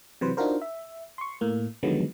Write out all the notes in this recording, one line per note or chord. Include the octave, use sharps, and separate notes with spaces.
C3 E3 F#3 B4 C5
D4 D#4 F4 F#4 A#4 C5
E5
C6 C#6
A2 A#3
D3 D#3 F3 F#3 G#3 B3